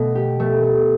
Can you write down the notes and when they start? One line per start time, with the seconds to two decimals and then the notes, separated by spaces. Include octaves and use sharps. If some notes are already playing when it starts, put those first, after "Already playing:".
Already playing: B2 A3
0.15 G4
0.40 A3
0.63 A3